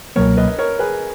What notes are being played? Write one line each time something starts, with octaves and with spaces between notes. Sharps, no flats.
C#2 B2 F#3 A#3 A#4 C#5
B4 D#5
D#5
A#4 C#5
G#4 B4